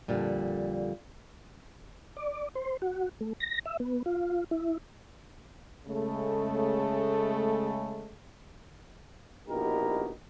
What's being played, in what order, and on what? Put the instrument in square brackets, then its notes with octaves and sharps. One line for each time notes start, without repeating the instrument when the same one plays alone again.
[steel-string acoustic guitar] F2 A#2 D3 G3
[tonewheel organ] D5
C5
F#4
A3
A#6
E5
B3
F4
E4
[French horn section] C#3 G#3 A3
[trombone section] A#1 B2 D#4 E4 G4 A#4